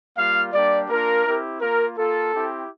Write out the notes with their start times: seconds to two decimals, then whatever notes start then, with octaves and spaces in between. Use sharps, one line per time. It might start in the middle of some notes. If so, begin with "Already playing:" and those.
0.17 G3 A#3 F4 F5
0.53 G3 A#3 D4 G4 D5
0.89 A#3 D4 F4 A#4
1.25 C4 E4 G4
1.61 A#3 F4 A#4
1.97 A#3 F4 A4
2.33 C4 E4 G4